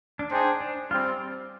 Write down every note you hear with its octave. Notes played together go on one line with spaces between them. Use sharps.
D4
D4 D#4 G#4 C5 G5
D4
G3 C4 F4